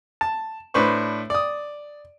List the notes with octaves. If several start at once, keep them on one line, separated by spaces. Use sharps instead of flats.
A5
A2 D4 B4 C5 C#6
D5 D#6